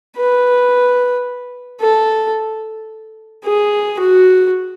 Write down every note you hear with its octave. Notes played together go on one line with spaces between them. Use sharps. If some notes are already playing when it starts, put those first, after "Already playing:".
B4
A4
G#4
F#4